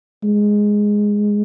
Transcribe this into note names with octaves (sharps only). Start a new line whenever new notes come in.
G#3